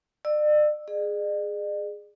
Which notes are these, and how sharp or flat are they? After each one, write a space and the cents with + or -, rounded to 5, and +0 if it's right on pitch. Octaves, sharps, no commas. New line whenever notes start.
D5 +40 E6 +0
G#4 +0 D5 +45